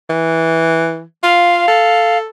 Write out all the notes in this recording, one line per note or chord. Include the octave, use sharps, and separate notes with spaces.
E3
F4 F5
A4